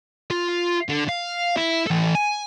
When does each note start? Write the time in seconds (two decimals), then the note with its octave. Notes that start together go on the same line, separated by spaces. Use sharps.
0.31 F4
0.89 D3
1.09 F5
1.57 E4
1.87 E3 A4
2.15 G#5